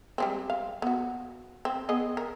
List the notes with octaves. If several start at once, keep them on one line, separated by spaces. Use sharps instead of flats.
G3 G#3 C4
F5
B3 F#4
C4
B3 G#4 D#5
A#4